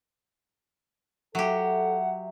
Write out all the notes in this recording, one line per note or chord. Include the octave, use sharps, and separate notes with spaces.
F#3 G4 A4 E5 F#5